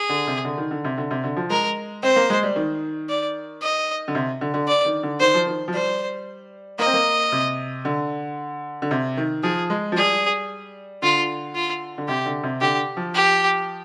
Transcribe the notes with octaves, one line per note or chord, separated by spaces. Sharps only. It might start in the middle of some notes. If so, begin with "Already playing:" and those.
Already playing: G#4
D3
C3
D3
D#3
D3
C3
D3
C3
D3
F3
G#3 A#4
C4 C5
A#3
G#3
G3
D#3
D5
D#5
D3
C3
D3
D3
D5
D#3
D3
D#3 C5
F3
D#3
F3
G3 C5
A#3 D#5
C4
A#3
C3
D3
D3
C3
D#3
F3 G#4
G#3
F3
G3 G#4
D3 F4
F4
D3
C3 G4
D3
C3
D3 G4
F3
G4